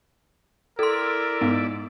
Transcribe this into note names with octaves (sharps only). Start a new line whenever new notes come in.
E4 A4 A#4 D5 C6
G#2 B3